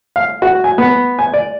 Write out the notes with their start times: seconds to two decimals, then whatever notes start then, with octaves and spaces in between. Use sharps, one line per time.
0.16 F5
0.42 F#4
0.64 G#5
0.78 B3
1.19 G#5
1.34 D5